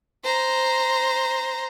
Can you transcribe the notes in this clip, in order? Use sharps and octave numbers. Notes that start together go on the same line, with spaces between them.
C5 A#5